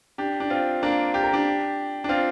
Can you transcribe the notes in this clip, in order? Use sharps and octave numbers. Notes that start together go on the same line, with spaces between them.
D4 G4
D4
C4 F4
A#3 D4
G4
A#4
D4 G4
D4
C4 F4